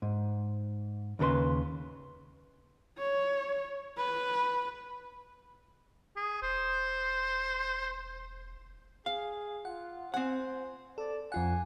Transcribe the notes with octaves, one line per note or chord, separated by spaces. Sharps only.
G#2
D#2 C#3 A4 B4 C6
C#5
B4
G#4
E1 C5
G#4 F5
F4 F#5
C4 C5 F#5 G#5
A4 D5
F2 F4 F#5 G#5